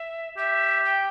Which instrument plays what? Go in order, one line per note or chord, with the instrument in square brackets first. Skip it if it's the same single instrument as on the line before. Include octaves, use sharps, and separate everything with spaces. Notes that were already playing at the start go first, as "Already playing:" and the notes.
Already playing: [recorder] E5
[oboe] G4 [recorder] E5
[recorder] G5